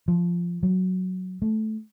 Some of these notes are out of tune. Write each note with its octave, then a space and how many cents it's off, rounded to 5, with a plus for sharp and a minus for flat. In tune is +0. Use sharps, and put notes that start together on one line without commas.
F3 -5
F#3 +0
A3 -15